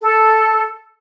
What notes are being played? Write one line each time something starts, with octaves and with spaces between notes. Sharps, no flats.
A4